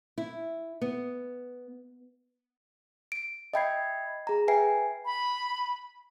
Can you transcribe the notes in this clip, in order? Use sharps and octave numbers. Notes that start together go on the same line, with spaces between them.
E4
B3
D7
D#5 E5 G5 B5 G#6 C7
G#4 A#5
B4 E5 G5 G#5 C7
B5